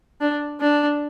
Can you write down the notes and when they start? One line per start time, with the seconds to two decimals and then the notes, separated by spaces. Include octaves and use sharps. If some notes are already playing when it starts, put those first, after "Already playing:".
0.21 D4
0.60 D4